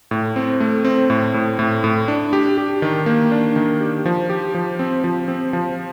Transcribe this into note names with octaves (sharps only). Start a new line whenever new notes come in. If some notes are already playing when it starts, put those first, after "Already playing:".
A2
C4
A3
C4
A2
A2
A2
A2
D4
G4
G4
D#3
A#3
D4
D#3
G4
F3
G4
F3
C4
F3
C4
F3